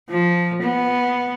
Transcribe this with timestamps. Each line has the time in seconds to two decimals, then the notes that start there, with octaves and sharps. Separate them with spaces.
0.10 F3
0.63 B3